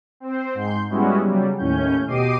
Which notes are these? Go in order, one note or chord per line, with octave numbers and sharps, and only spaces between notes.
C4 C5
G#2 C6 G6
G3 G#3 B3 C#4 E4 F#4
C#3 F#3 G3
D#2 A2 C#4 G6
B2 G4 D#5 D6 C7 D#7